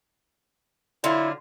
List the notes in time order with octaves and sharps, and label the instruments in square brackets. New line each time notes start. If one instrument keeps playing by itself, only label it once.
[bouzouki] D3 F#3 F4 [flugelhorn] E4